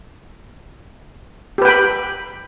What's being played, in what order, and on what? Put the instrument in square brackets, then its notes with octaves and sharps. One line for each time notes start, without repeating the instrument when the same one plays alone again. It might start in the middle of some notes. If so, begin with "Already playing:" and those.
[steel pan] G4
B4
G5
B5